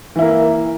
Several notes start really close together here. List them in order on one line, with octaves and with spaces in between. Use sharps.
E3 E4 A#3